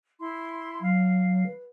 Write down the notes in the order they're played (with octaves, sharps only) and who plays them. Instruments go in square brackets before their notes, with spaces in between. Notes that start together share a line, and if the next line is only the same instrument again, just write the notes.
[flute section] E4 C6
[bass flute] F#3 [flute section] F5
[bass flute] B4